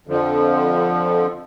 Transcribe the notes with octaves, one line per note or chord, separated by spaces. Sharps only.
F2 D3 F3